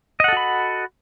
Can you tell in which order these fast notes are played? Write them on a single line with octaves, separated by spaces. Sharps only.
D#5 F#5 A4 F#4 B5